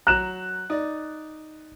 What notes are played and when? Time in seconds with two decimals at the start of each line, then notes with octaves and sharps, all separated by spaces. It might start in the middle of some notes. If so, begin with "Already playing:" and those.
0.07 F#3 A#5 F#6 E7
0.70 D#4 D5